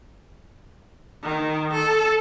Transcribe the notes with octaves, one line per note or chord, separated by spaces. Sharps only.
D#3
A4